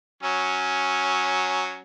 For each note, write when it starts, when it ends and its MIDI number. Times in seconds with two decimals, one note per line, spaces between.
0.23 1.79 54
0.23 1.79 61